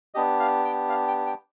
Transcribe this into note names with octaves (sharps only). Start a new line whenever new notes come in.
B3 D4 G4 D#5
F5
G5
F5
G5
G5